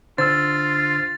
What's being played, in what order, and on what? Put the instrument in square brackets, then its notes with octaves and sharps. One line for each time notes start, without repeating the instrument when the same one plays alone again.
[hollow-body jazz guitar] D3 [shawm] F4 [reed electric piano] C5 E6 [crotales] A6